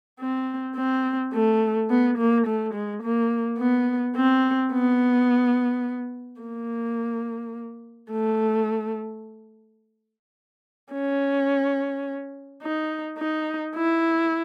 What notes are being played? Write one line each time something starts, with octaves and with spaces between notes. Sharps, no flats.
C4
C4
A3
B3
A#3
A3
G#3
A#3
B3
C4
B3
A#3
A3
C#4
D#4
D#4
E4